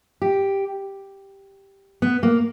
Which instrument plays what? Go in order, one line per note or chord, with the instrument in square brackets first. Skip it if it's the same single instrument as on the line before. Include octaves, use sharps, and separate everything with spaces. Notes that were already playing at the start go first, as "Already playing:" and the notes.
[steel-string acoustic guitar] G4
B3
A#3